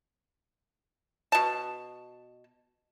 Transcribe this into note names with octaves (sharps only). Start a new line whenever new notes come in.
B2 A5